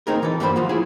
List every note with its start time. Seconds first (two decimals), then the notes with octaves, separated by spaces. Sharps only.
0.07 A3 C4 D#4 G#4 A#4
0.23 E3 A4
0.40 G2 G3 A#3 G4 C5 B5
0.56 F3 F4 F#4
0.69 E4 G#4 B4